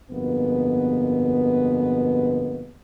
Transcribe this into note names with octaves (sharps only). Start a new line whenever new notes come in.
G1 F2 B2 G#3 A#3 B3